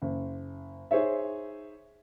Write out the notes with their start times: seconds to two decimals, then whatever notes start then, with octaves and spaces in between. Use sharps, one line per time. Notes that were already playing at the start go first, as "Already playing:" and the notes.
0.02 F#1
0.91 D#4 G#4 C5 C#5 E5